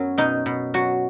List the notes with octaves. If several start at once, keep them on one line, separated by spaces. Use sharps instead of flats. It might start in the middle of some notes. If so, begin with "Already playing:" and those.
Already playing: F#2 F#3 B3 C#4
B2 D#4
B2
F#3 F#4